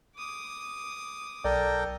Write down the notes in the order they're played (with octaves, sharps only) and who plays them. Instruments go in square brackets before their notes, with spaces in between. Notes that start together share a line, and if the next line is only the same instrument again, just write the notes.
[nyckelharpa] D6 D#6
[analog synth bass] B1 [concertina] A4 A#4 G5 [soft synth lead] D5